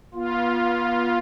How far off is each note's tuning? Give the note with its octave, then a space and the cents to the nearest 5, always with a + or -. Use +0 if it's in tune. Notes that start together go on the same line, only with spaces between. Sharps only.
B3 -40 F4 +0